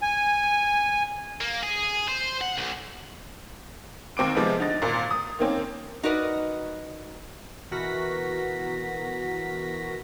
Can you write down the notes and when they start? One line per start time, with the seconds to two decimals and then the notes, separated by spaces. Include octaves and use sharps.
0.02 G#5
1.41 A#3
1.63 G#4
2.08 C5
2.41 F#5
2.58 B1
4.17 D#2 C4 D6 D7
4.35 C3 F3 G#3 B3
4.60 D3 D#4 A6
4.82 G#1 A#2
5.11 D#6
5.39 D#3 A#3 C4 C#4
6.03 D#4 F#4 A#4 B4 D5 D#5
7.71 B2 E3 F#4 A#4 A#6 B6